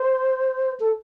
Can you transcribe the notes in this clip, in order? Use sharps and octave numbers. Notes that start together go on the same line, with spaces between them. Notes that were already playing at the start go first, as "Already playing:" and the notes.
Already playing: C5
A4